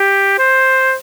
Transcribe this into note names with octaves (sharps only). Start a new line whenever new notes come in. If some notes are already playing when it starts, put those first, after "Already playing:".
Already playing: G4
C5